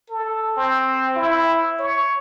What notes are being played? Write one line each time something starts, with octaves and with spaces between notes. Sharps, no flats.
A4
C4
E4
C#5